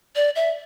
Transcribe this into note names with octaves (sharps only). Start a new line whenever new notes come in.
D5
E5